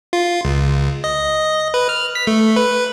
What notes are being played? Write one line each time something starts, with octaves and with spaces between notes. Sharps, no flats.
F4
C#2
D#5
B4
F6
B6
A3
B4